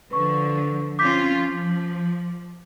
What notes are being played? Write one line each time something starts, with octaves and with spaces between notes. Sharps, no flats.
D3 F3 B4 C#6
C4 C#4 F4 D6 G6 B6
F3